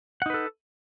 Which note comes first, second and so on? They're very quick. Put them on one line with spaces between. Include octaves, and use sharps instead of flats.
F#5 D#4 B4 A4